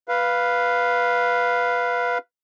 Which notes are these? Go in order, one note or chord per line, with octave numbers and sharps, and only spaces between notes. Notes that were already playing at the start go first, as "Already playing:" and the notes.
B4 F5